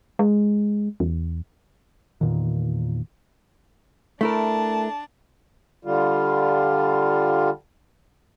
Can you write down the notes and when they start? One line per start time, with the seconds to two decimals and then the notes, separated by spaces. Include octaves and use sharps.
0.19 G#3
1.00 E2
2.21 E2 A#2 D#3
4.21 A3 D4 E4 A#4 A5
5.85 D3 G3 F4